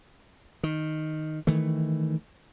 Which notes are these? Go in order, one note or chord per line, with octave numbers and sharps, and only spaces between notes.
D#3
D#3 E3 A3